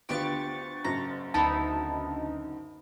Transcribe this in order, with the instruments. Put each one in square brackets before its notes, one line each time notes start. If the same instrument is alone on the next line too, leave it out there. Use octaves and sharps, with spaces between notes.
[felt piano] D2 B3 F4 [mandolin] D4 G4 [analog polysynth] C#6 A6
[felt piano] F#1 F#2 [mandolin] A#5
[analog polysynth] D2 D#4 [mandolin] B3 E4 B5 [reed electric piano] A5